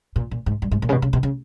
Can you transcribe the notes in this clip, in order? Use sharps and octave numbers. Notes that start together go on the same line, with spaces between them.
A#2
A#2
G#2
G2
G#2
A#2
C#3
B2
C#3
B2
C#3